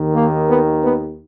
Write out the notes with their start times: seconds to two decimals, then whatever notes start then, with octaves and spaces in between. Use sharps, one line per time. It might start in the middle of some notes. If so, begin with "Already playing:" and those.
Already playing: D#2 D#3
0.15 A#3
0.49 B3
0.82 B3